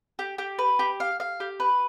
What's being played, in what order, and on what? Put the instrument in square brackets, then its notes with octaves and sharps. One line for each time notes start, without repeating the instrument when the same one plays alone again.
[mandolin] G4
G4
B4
G4
F5
F5
G4
B4